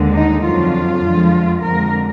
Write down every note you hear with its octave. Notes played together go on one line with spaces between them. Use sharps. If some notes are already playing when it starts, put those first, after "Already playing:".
Already playing: D#2 D3 G#3
D#4
F2 D3 F#3 F4
F2 D3 F3 G#3
F2 D3 G#3 A#4